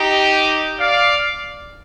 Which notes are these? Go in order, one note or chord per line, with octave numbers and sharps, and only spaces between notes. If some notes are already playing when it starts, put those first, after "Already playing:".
Already playing: D#4 G4
D5 F5